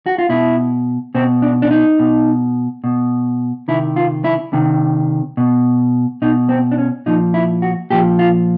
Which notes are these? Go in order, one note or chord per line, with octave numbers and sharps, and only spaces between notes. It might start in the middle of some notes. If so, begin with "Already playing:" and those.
F#4
F4
B2 E4
B2 C4
D4
D4
D#4
B2
B2
C3 D#3 E4
F4
E4
C3 D#3
B2
B2 D#4
C4
D4
C#4
A#2 F3 D#4
E4
F#4
A#2 F3 G4
F4